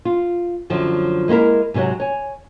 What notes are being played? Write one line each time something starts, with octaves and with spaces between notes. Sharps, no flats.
F4
F#2 D3 F3 F#3
G#3 A#3 B3 E4 A#4
G#2 C3 F#3 C#5 F#5
C#5 G#5